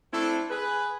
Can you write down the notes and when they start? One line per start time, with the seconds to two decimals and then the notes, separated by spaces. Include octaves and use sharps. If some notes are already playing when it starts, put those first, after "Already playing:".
0.12 A3 C4 D4 E4 A4
0.50 G#4 B4